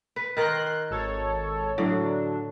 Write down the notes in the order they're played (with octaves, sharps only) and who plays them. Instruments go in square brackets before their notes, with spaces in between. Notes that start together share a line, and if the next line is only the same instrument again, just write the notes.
[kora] B4
[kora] D#3 A#4 [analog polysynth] C6 F#6
[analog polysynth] G#1 A4 C#5
[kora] A2 [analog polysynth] D3 F#3 D4